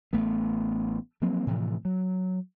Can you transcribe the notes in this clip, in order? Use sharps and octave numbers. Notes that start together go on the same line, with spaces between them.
A1 A3 B3
F3 F#3 A#3 C4
A2 C3 E3 F3
F#3